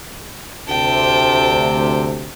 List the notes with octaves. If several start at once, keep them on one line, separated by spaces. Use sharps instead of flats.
D2 C3 G5 A5